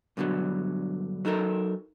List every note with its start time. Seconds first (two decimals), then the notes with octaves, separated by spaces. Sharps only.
0.17 G2 B2 D3 F3 F#3
1.25 F#3 D#4 A4 A#4